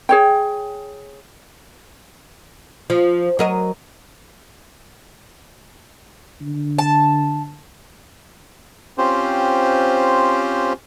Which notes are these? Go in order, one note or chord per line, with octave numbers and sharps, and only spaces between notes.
G#4 C#5 G5
F3
F#3 A#4 D#5
D3
A5
C4 C#4 F4 G4 C5